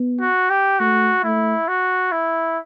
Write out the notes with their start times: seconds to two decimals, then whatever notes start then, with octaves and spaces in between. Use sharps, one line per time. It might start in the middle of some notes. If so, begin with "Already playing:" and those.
Already playing: B3
0.21 F#4
0.50 G4
0.79 A3 F#4
1.24 A3 E4
1.68 F#4
2.12 E4